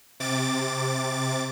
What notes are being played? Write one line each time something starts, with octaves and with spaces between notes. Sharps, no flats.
C3 D6 A6